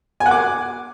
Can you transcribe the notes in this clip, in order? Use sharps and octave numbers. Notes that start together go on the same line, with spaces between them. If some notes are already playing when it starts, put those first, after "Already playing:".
G#5
F#5
D6